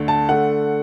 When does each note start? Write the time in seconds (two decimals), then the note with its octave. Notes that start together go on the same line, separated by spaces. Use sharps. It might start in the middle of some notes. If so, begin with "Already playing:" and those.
Already playing: D2 D3 A3
0.08 A5
0.29 D3 A3 F#5